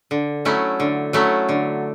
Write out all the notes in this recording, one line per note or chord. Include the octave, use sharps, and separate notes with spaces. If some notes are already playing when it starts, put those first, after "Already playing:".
D3
F#3 A3 C#4 E4
D3
F#3 A3 C#4 E4
D3